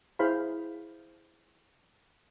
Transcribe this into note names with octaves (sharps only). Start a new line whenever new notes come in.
E4 G#4 C5 F5 B5